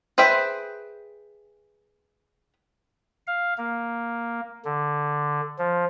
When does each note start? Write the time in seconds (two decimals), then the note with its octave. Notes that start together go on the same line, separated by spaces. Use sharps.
0.18 G#4 B4 C5 E5 G5
3.27 F5
3.58 A#3
4.65 D3
5.58 F3